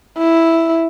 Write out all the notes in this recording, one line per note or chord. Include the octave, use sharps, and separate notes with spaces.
E4